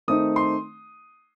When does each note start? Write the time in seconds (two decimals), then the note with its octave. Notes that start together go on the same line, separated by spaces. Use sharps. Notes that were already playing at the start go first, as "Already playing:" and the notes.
0.08 D#3 A3 C4 D#4 D#6
0.36 C6